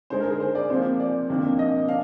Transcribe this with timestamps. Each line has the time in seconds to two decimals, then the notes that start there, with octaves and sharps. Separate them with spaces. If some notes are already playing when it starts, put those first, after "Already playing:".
0.10 D3 G#3 D#4 C5
0.20 A#4
0.30 G#4
0.40 C5
0.55 D5
0.70 C3 F3 A#3 C5
1.00 D5
1.29 F2 C3 D#3 A#3 D4
1.59 D#5
1.88 D4 F5